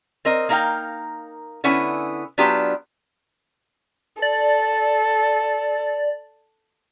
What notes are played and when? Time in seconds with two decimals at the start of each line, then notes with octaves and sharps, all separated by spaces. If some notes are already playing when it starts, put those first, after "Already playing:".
0.25 C4 A#4 D#5
0.49 A#3 D#4 A#4 F5 G5
1.64 D3 B3 C#4 E4 G#5
2.38 F#3 B3 D4 F4 G4
4.22 A4 D5